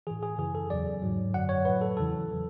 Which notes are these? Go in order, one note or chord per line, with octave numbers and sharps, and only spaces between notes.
A2 E3 G#4
G#4
F#2 C#3 E3 G#4
A4
E2 C#3 F#3 D5
G#2 F#3
F#2 D3 F#3 F#5
C#5
A2 F#3 B4
A4
E2 C#3 E3 A4
F#3